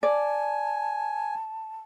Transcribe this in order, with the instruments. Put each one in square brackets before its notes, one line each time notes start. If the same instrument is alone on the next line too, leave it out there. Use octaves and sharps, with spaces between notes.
[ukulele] D5 [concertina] G#5 [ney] A5